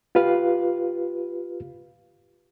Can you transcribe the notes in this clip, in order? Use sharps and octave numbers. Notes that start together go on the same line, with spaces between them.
F4 G4 B4 F5